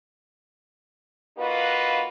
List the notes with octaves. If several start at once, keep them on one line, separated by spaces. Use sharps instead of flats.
A#3 D#4 F4 F#4 B4